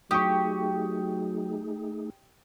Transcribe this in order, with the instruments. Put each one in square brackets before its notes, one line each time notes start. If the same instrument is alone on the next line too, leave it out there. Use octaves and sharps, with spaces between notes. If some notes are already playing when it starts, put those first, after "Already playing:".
[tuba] F#3 [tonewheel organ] A3 D#4 G#4 [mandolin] G4 [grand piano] C#6 D#6